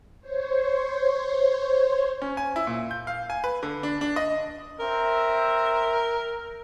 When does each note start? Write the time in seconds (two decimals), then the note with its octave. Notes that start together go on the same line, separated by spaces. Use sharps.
0.21 C5 C#5
2.22 C#4
2.37 G#5
2.56 E4
2.67 A#2
2.91 G6
3.07 F5
3.30 G#5
3.44 B4
3.63 D3
3.83 D4
4.01 D4
4.16 D#5
4.80 C4 A#4 E5